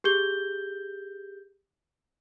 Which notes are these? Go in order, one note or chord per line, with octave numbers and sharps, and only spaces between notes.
G4 G#4 G6 G7